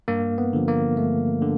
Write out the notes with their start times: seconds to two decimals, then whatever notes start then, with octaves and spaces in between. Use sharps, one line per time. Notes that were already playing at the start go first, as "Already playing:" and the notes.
0.08 G2 A#3
0.38 B3
0.53 D3 F3
0.68 A#3
0.97 G2 A3
1.42 D3